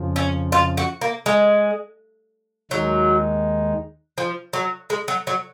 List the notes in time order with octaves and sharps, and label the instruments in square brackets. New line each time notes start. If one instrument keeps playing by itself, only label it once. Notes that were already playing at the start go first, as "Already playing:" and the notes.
Already playing: [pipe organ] F2 C#3 F3
[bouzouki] C#4
F4
F#4
A#3
G#3
[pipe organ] D#2 D#3 G#3 D#4 [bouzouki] F#3
[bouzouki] F3
F#3
G#3
F#3
F#3